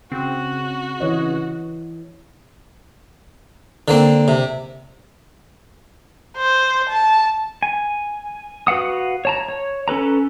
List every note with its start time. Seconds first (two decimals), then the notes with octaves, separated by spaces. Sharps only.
0.12 C#3 C4 F#4
1.00 E3 C#5 D#5
3.88 D3 A#3 C4
4.28 C3
6.37 C5
6.89 A5
7.63 G#5
8.67 F#4 B4 F5 F#5 D#6
9.25 C#5 A5 A#5
9.49 C#5
9.88 C#4 A4 B4 A#5